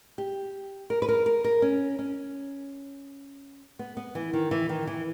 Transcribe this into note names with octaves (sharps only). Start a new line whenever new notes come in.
G4
A#4
B4
A#4
A#4
A#4
C#4
C#4
B3
B3
E3
D#3
E3
D#3
E3